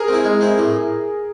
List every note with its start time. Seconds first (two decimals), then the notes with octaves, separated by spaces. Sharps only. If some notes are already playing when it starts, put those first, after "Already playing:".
Already playing: G#4 A#4
0.08 C4 E4
0.24 G#3
0.41 C4 E4
0.58 A2